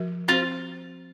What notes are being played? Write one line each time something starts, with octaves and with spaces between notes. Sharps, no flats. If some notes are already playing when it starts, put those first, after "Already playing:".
Already playing: F3 F#4 A#4
C4 F4 F#4 C5